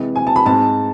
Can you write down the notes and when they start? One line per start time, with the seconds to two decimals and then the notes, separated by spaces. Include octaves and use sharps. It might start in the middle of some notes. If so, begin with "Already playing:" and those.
Already playing: C3 E3 G#3
0.16 G#5
0.27 A5
0.36 B5
0.45 G#2 G#3 C4 A5